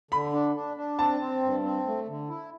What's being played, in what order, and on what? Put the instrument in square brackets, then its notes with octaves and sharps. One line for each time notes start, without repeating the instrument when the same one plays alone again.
[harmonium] D3 [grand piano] B5
[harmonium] D4
D4
D4
[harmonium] C4 [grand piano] A5
[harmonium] C4
G2
C4
A3
D3
E4